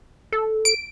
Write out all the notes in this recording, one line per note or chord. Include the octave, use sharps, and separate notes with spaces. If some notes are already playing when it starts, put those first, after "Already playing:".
A4
D7